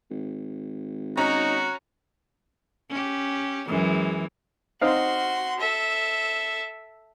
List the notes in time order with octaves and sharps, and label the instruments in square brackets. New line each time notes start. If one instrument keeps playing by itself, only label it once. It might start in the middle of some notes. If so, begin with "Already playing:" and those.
[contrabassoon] G#1
[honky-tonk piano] C#4 C#5 A#5 [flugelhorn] D#4 [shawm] F#4
[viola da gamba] C#4 G4
F#2 E3 G#3
[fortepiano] C4 D#4 F5 [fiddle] F#4 C6
[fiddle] A4 E5